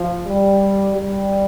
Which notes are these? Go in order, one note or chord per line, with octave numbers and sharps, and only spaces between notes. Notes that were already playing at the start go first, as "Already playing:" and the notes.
Already playing: F3
G3
G3